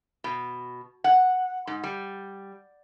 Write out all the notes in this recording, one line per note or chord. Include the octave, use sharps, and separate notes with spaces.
B2
F#5
G#2
G3